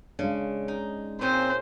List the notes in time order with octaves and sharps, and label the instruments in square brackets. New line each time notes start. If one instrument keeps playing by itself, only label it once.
[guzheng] C#3 [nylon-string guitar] G#3 C#4 D4
[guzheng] D#4
[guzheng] A#2 C#4 G#4 [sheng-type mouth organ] C4 [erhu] C5